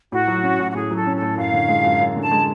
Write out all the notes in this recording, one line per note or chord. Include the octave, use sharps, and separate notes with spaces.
A2 F#4
F#3
C#4
A2
F#4
A2 G#4
F#3
A4
C#4
A4
A2
F#2 F5
D3
G#3
F#2
F#2
D3 A5
G#3